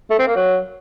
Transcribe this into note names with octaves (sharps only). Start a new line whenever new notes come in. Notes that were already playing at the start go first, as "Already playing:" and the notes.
A3
C4
A#3
F#3